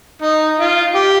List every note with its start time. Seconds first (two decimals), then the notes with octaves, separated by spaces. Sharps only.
0.22 D#4
0.59 F4
0.95 G4